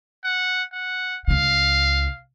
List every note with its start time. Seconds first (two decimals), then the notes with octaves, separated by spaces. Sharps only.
0.25 F#5
0.73 F#5
1.28 C#2 C#3 F5